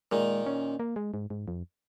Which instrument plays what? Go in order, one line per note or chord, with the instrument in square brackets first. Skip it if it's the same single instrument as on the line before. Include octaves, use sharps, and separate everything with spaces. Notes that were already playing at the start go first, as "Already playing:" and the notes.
[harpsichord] A#2 D#3 [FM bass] G#3
[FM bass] C#4
A#3
G#3
G#2
G#2
F2